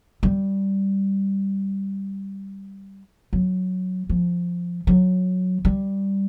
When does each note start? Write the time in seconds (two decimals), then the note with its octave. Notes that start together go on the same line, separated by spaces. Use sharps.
0.23 G3
3.33 F#3
4.09 F3
4.87 F#3
5.65 G3